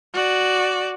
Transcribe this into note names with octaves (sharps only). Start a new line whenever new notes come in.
F#4 D5